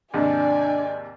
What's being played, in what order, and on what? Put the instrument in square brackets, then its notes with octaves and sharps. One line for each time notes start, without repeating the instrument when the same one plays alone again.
[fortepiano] D#2 G#2 C3 [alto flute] D4 [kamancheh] D5 G#5